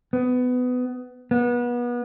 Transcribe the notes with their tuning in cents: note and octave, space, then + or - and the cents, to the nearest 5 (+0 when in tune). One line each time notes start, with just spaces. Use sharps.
B3 +20
B3 -30